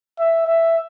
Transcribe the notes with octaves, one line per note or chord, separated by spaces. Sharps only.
E5
E5